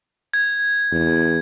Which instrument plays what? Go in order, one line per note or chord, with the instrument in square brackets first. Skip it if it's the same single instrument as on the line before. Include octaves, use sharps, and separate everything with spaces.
[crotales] G#6
[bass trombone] E2